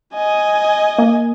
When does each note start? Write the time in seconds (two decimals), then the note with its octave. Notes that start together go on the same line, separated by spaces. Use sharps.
0.15 D#5 G#5
0.98 A#3